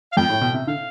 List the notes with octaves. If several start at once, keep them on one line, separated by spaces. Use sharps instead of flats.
F5
F2 G5
A2
B2
C3
D3 F5